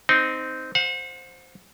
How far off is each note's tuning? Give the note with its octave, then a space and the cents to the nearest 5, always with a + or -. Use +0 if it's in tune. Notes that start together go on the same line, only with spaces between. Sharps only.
C4 -15 D#4 +0
C5 +0 F#5 -40